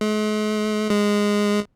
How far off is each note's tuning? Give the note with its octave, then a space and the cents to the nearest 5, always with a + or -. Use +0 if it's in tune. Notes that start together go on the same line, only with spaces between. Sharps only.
G#3 +45
G#3 -10